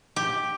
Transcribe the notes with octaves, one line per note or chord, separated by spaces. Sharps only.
G4